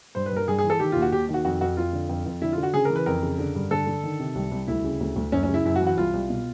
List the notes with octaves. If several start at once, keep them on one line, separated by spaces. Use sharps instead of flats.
G2 C5
B4
G2
A#4
G2 G#4
G#4
E3
A4
D#3 G4
D#2 F4
F#4
D#2 G4
D#3
F#4
F2 F#4
F2 F#4
F2 F4
D3
F2
F2
D3 E4
F4
D3
F#4
C#3 G#4
A#4
E3
B4
F2 A#4
C#3
D3
G2
D3 A4
D3
D#3
C3
C2
C2
D2 E4
C#3
D2
D2
F#2 C#4
C#4
C#3
E4
F#2 E4
F#4
E3
F#4
C2 F4
C2
B2